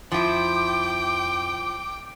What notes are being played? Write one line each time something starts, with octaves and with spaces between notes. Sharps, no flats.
F2 F3 E4 G5 D6